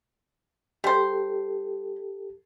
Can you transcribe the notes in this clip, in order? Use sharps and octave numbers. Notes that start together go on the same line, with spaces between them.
G3 G4 A4 C5